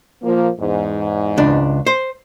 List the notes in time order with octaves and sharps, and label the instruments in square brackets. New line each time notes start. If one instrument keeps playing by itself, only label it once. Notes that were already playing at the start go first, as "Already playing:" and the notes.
[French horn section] A#2 F3 A#3
E2 G#2
[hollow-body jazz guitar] C#2 D4
C5